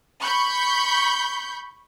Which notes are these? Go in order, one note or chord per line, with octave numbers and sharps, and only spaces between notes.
B5 C#6 G6